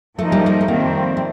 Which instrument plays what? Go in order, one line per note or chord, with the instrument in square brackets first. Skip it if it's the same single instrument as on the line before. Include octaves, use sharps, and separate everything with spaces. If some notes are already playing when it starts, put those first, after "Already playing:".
[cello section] F3 A#3 D#4 [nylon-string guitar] A3
[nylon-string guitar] G3
A3
A3
[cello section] F2 D#3 G3 C4 [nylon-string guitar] A#3
[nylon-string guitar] A3